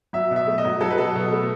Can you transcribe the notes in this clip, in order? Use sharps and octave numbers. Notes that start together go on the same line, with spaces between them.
F#3 E5
B2
E5
A3
D#5
F#3
F#3 A4
B4
B2 A4
B2
A3